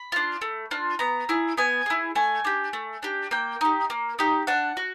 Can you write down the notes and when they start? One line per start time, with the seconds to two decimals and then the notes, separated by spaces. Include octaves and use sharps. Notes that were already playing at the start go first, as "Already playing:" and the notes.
Already playing: B5
0.12 D4 F4
0.42 A3
0.71 D4 F4
0.99 B3 A#5
1.29 E4 G#4
1.57 B3 G#5
1.86 E4 G#4
2.16 A3 G#5
2.45 D4 G4
2.73 A3
3.03 D4 G4
3.31 A#3 G5
3.61 D#4 G4
3.90 A#3
4.19 D#4 G4
4.47 D4 F#5
4.77 F#4